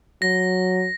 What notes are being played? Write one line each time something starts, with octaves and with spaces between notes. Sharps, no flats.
F#3 A#6